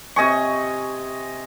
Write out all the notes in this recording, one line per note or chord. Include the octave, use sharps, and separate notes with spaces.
C3 D#5 G#5 C#6